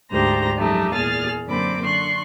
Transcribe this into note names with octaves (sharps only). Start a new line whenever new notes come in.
D2 G#2 G4 C5 A#5 A#6
F#2 F3 G#3 A3 D#4 G4
E2 A#2 G#4 F6 A6
F#2 D3 A#3 C4 B5 D6
D3 C6 C#6 F#6